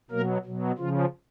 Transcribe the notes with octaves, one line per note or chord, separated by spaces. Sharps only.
B2 F#3 A#3 A#4
B2 F#3
C#3 F3 F4